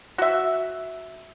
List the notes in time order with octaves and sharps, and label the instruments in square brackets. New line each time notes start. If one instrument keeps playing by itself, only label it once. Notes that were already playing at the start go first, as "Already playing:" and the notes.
[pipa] F#4 E5